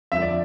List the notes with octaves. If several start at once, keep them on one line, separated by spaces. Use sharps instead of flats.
F2 D3 F3 E5
D5